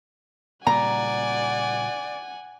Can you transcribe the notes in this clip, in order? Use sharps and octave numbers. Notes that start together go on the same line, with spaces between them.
A#2 C#3 G3 D5 F#5 G#5 A#5